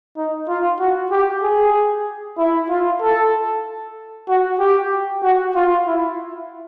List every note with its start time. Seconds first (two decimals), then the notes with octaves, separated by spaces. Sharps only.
0.17 D#4
0.48 F4
0.79 F#4
1.11 G4
1.43 G#4
2.38 E4
2.69 F4
3.01 A4
4.28 F#4
4.59 G4
5.23 F#4
5.55 F4
5.86 E4